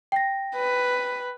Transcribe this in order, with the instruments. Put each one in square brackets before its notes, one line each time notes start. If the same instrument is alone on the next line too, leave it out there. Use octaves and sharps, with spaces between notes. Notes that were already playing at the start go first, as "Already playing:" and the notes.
[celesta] G5 A#6
[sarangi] B4